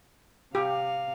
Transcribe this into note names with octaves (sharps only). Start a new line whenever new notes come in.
C3 G4 F5